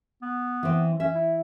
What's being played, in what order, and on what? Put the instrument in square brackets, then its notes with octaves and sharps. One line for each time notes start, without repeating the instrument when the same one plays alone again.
[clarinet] B3
[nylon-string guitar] E3 C4
[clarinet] C#4 [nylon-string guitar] E5
[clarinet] E4